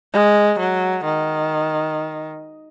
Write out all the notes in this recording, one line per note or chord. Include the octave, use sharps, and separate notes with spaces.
G#3
F#3
D#3